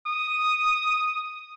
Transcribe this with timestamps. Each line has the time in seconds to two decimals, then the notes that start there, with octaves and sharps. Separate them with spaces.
0.06 D#6